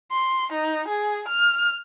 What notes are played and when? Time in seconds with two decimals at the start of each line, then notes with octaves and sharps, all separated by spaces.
0.12 C6
0.52 D#4
0.88 G#4
1.28 F6